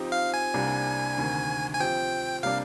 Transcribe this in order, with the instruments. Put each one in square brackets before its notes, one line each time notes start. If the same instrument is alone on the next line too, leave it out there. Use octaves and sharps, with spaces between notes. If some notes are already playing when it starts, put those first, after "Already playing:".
Already playing: [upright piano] F3 C4 D#4 G4
[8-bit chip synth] F5
G#5
[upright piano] C2 C3 G3 A#3 D4
D2 C3 D#3
[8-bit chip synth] G#5
[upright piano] F3 C4 G4 [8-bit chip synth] G5
[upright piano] C3 G3 A#3 D4 [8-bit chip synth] F5